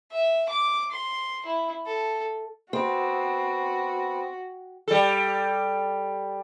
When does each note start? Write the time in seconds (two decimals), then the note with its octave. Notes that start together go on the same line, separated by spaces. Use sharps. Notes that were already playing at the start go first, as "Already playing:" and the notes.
0.12 E5
0.49 D6
0.92 C6
1.46 E4
1.86 A4
2.73 B3 C4 F#4
4.88 G3 A4